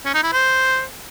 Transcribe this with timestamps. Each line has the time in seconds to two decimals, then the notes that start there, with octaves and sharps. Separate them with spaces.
0.05 C#4
0.14 D#4
0.23 E4
0.32 C5